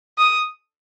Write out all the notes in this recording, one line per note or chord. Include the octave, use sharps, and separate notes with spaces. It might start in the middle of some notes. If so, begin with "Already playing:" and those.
D#6